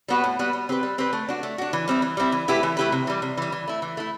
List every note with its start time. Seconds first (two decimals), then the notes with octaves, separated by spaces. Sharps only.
0.08 G3 B3 F#4 B4
0.24 A2
0.39 G3 B3 F#4 B4
0.53 G3
0.69 C4 G4 B4
0.83 G3
0.98 C4 G4 B4
1.13 A3
1.29 D4 F#4
1.43 A3
1.58 D4 F#4
1.73 E3
1.88 G3 C4 E4
2.02 E3
2.17 G3 C4 E4
2.32 E3
2.48 A3 E4 G4 B4
2.63 E3
2.77 A3 E4 G4 B4
2.92 C3
3.07 E3 G3
3.22 C3
3.37 E3 G3
3.52 E3
3.67 A3 E4
3.82 E3
3.97 A3 E4